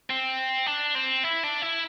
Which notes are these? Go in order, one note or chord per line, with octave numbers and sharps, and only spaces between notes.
C4
D4
C4
E4
D4
E4